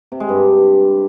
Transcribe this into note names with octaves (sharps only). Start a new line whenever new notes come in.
C3
G#3
G2